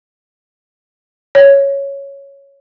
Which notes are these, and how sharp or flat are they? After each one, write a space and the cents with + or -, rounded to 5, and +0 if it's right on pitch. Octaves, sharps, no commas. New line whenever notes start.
C#5 +0